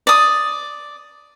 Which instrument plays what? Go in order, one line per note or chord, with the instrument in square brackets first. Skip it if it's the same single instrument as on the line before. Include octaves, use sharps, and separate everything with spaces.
[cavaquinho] D5 D#6